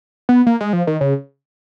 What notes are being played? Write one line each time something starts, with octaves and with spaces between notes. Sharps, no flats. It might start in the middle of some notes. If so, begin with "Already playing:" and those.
B3
A#3
G#3
F3
D#3
C#3